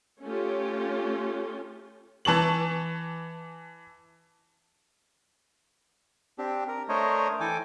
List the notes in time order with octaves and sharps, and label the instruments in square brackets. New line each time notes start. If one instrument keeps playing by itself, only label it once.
[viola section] A3 C#4 F4 G4
[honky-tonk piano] E3 A5 C#6 F#7
[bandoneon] C4 D4 G4
A#4
A3 D4 A#4 C5 C#5 D#5
E3 A4 G5 G#5 D6